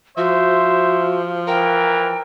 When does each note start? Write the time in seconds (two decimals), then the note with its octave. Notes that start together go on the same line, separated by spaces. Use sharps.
0.17 F3 F#4 C5 E5
1.48 E3 A#4 G5